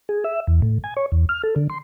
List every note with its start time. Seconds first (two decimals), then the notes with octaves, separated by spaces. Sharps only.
0.09 G#4
0.24 E5
0.47 E2
0.62 A2
0.84 G#5
0.97 C#5
1.12 E2
1.29 F6
1.43 A4
1.56 D3
1.70 C6